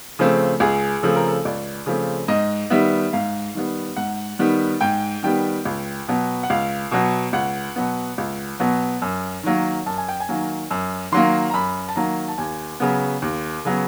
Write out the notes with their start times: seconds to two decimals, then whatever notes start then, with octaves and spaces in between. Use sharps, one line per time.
0.19 C#3 F3 A3 C4
0.60 C#2 G#4
1.03 C#3 F3 A3 C4 A4
1.16 A#4
1.28 A4
1.45 C#2 D5
1.86 C#3 F3 A3 C4
2.28 G#2 D#5
2.70 D#3 G3 B3 E5
3.13 G#2 F5
3.54 D#3 G3 B3
3.96 G#2 F#5
4.39 D#3 G3 B3
4.81 G#2 G5
5.23 D#3 G3 B3 G5
5.65 C#2
6.08 B2 F#3 B3
6.43 F#5
6.50 C#2 F5
6.91 B2 F#3 B3
7.33 C#2 F#5
7.76 B2 F#3 B3
8.18 C#2
8.60 B2 F#3 B3
9.02 F#2
9.43 D#3 F#3 A#3
9.86 F#2 A5
9.98 G#5
10.09 G5
10.20 G#5
10.29 D#3 F#3 A#3
10.71 F#2
11.12 D#3 F#3 A#3 C6
11.50 A#5
11.54 F#2 B5
11.88 A5
11.96 D#3 F#3 A#3 A#5
12.28 A5
12.38 D#2 G#5
12.80 C#3 F#3 B3
13.22 D#2
13.65 C#3 F#3 B3